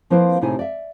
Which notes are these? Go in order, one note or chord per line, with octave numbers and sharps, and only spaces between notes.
F3 A#3 C4 E4 B4 C5
A2 C3 D#4 E4 G#4 G#5
D5 E5